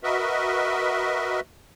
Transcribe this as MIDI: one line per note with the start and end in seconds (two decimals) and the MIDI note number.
0.03 1.40 66
0.03 1.40 70
0.03 1.40 71
0.03 1.40 75
0.03 1.40 76